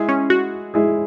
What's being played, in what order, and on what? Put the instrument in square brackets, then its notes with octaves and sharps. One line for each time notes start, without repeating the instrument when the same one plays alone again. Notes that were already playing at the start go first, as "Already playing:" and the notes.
Already playing: [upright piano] G#3 E4 G#4
[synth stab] C#4
F#4
[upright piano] G#3 E4 G#4